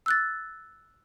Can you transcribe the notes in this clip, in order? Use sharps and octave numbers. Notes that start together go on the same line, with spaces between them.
E6 F#6 A6